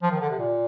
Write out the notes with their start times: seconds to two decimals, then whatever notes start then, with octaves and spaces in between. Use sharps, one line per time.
0.02 F3
0.12 D#3
0.21 D3
0.30 C3
0.39 A#2